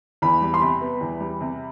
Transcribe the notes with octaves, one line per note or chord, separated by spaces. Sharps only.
E2 B5
G3
C6
C3 B5
B3
E2
G3
C3